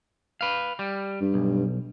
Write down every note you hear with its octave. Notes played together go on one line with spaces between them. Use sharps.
B4 F5
G3
G2
B1